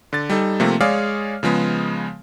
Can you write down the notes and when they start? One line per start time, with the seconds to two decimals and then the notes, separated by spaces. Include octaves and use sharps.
0.13 D3 A6
0.30 G3 D#4 A4
0.60 C3 F3 A3 A#3 C4
0.81 G#3 G#4 C#5 D5 F5 F6
1.43 C#3 F3 G#3 B3